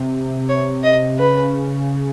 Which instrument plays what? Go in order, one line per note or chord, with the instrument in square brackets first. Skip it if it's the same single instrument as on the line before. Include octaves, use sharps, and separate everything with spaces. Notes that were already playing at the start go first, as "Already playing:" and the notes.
Already playing: [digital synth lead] C3
[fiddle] C#5
D#5
[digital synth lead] C#3 [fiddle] B4